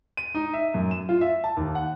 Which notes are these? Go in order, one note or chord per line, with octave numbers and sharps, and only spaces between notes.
D#7
D#4
E5
F#2
E7
F4
E5
A5
D#2
F#5